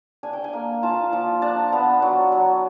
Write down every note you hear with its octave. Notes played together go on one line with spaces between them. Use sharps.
D4 G#5
G5
G#5
A#3
F4 A5
F3
D4 A5
B3
F#3
F#3